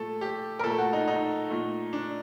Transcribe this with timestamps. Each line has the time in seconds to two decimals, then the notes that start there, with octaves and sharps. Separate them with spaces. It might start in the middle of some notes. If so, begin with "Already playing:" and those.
Already playing: A#2 A3 A4
0.21 G4
0.59 A#4
0.63 A#2 A3 A4
0.78 F#4
0.93 D#4
1.08 D#4
1.50 A#2 A3
1.93 D4